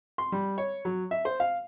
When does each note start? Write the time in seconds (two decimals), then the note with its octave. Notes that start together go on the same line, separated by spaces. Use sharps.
0.18 C6
0.32 G3
0.58 C#5
0.85 F#3
1.11 E5
1.25 C5
1.40 F5